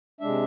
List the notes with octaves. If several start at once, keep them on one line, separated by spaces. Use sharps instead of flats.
C3 G#3 D4 E5